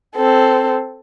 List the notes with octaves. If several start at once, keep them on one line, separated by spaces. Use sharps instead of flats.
C4 A4